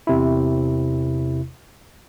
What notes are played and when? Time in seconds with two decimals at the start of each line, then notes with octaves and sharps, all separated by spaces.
0.07 E2 C3 E4